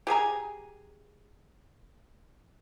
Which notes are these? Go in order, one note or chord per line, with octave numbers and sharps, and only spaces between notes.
G4 G#4 G#5 A#5